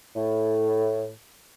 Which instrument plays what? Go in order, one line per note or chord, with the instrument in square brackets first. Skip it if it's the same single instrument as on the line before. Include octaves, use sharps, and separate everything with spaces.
[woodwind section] A2